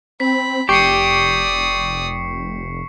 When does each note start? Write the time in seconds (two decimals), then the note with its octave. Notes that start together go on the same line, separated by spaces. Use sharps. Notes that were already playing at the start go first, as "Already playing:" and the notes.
0.20 C4 B5 B6
0.69 F1 G4 D5 C#6 D#6 C7 C#7